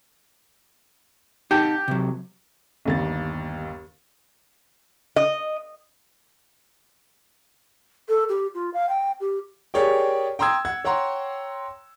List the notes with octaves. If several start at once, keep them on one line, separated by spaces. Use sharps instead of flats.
D#4 G4 F#5 A5
C3 F#3
G1 D#2 A6
D#5
A4
G4
F4
F5
G5
G4
G4 G#4 A#4 C#5 D5 G5
G5 A#5 C6 D#6 E6 G#6
F#5 G#6
C#5 F#5 G5 A#5 C6